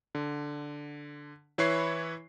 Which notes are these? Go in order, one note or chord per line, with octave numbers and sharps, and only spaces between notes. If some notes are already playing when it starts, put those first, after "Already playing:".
D3
E3 E4 B4 C#5 C#6 C7